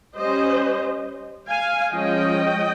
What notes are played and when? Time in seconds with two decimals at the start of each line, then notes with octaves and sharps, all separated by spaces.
0.17 G3 C#4 C5 D#5
1.48 F5 G#5
1.92 F3 G#3 C#4 D#5 G5